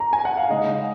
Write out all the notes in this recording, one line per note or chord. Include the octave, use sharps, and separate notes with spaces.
A#5
G#5
F#5
F5
C#3 G#3 D#4 D#5